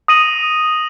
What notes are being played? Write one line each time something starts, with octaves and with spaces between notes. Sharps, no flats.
D#6 A#6 D#7 F#7